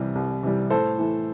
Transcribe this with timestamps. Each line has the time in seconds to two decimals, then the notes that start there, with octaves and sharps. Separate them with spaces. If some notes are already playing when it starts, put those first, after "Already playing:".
Already playing: C2 C3 E3 G3
0.15 C2
0.43 C3 E3 G3
0.70 A2 A4 C5
0.98 E3 A3